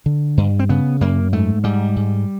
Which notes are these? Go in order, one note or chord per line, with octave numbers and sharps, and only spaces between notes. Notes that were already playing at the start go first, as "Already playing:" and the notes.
D3
G2
C4
C#3 B3
F#2 A#3
G#2 A3
G#2 G3
G#2